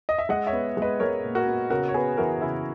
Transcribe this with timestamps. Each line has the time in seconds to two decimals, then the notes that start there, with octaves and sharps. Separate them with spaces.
0.09 D#5
0.18 E5
0.29 G#3 D#5 F#5
0.47 C#5 E5
0.53 B3
0.77 G#3 B4 D#5
1.00 G#3 A#4 C#5
1.24 A#2
1.35 F#4 A#4
1.47 B3
1.70 C#3 F#4 A#4
1.89 C#5
1.94 B3 G#4 B4
2.17 E3 F#4 A#4
2.41 C#3 E4